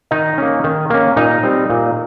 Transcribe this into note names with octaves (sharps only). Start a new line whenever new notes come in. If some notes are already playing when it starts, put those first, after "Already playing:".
D#3 D#4 D#5
A#3 C#4
D#3
A#3 C#4
A#2 D#4 D#5
G3 C4
A#2